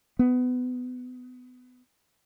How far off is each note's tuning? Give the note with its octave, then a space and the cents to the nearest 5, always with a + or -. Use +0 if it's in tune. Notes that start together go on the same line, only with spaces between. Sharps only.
B3 +25